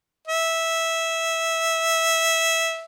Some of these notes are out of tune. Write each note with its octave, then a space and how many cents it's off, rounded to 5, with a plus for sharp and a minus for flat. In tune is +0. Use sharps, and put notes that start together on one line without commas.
E5 -10